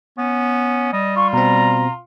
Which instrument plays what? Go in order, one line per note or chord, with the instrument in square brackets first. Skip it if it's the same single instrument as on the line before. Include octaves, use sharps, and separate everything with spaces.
[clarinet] B3 [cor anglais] C#4
[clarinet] G3 [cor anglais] D#5
[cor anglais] F4 [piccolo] C#6
[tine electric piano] B2 C4 [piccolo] A#5